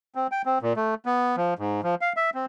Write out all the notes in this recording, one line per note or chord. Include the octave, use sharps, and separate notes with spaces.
C4
G5
C4
A#2
A3
B3
F3
G#2
F3
F5
E5
C4